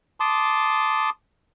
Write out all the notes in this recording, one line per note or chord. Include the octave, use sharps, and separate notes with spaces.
A5 C6 D6 D#6